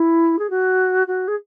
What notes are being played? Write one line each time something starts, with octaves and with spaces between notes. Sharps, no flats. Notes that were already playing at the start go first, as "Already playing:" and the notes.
Already playing: E4
G#4
F#4
F#4
G#4